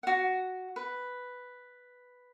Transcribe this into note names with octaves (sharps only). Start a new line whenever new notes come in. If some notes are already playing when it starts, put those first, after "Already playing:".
F#4 F#5
B4